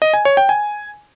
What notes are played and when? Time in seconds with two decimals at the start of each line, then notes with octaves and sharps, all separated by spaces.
0.02 D#5
0.14 G#5
0.25 C#5
0.37 G5
0.49 G#5